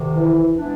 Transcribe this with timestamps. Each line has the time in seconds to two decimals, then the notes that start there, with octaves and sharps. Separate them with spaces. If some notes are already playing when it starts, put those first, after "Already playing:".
Already playing: D2 C3 D#3
0.16 E3
0.58 E3 G#3 B3 D4